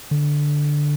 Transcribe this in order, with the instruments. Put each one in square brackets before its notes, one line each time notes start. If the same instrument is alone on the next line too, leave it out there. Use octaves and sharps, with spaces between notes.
[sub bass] D3